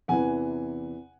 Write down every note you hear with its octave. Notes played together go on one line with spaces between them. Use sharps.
E2 C3 E3 F#5 G#5